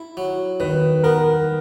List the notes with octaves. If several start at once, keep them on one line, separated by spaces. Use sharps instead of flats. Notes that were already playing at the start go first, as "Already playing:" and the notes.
Already playing: E4
F#3
D#3 B4
B3 A#4